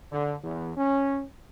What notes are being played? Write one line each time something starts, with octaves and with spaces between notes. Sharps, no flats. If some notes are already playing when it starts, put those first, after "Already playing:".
D3
E2
C#4